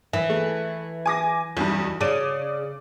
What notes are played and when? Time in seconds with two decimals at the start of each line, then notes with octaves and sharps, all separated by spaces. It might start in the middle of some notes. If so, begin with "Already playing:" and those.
0.13 E3
0.30 A3
1.06 G#5 D6 A#6
1.57 B1 E2 G2
2.01 C#3 D5 D#7